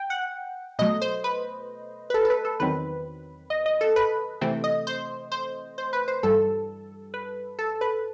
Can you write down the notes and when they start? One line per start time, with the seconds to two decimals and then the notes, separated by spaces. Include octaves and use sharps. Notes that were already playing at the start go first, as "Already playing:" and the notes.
Already playing: G5
0.10 F#5
0.79 B2 F#3 A3 D#5
1.02 C5
1.24 B4
2.10 B4
2.14 A4
2.25 A4
2.30 B4
2.45 A4
2.60 E2 D#3 F#3 C4 B4
3.50 D#5
3.66 D#5
3.81 A4
3.96 B4
4.41 C3 E3 A3 C4
4.64 D#5
4.87 C5
5.32 C5
5.78 C5
5.93 B4
6.08 C5
6.23 G2 E3 G3 A4
7.14 B4
7.59 A4
7.81 B4